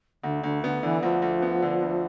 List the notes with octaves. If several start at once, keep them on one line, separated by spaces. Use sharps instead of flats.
D2 D3
D2 D3
D3 B3
D3 E3
D2 F3
D2
B3
D3
D2